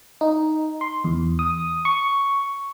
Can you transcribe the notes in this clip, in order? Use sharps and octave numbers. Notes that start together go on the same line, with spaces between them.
D#4
C6
E2
D#6
C#6